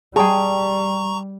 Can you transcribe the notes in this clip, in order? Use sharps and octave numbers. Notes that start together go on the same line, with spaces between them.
G3 G#4 G5 A5 A#5 C#6